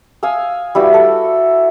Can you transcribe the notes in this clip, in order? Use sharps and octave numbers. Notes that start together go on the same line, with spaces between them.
F5 G#5 D#6 E6
G3 E4 F#4 B4
A4 D5